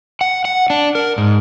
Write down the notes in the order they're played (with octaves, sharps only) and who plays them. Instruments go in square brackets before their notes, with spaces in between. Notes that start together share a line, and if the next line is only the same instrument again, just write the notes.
[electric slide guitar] F#5
F#5
D4
A#4
G#2